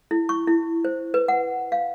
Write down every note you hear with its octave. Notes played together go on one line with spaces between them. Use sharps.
E4
C#6
E4
C5
B4
F#5
F5